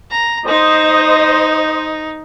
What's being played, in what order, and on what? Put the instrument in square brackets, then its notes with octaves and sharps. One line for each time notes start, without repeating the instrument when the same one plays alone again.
[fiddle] A#5
[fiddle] D#4 [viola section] C5 D#5